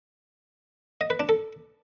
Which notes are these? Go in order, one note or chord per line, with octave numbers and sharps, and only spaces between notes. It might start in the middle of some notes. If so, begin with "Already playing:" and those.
D#5
B4
D4
A4